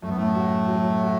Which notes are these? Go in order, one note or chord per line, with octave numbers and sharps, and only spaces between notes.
F#2 A3
B3
A2 A3
F#4
F#3
F#4